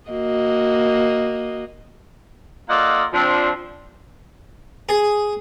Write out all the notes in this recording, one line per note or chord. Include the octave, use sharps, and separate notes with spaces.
A#3 F#4 D#5
A#3 F4 A4 D5 D#5 F#5
F3 C4 D4
G#4